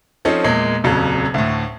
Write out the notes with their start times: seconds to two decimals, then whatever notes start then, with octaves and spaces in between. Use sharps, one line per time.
0.25 F3 C4 C#4 D#4 A4
0.44 E2 A#2 G#3 A#3
0.84 D#1 F2 C#3 F#3
1.34 D2 A2